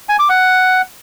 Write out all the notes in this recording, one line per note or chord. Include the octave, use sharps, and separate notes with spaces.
G#5
D6
F#5